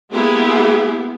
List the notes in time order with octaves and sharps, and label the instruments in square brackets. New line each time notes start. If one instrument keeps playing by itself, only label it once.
[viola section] G#3 A#3 B3 E4 G4 G#4